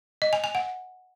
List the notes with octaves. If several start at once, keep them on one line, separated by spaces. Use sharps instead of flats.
D#5
G#5
G#5
F#5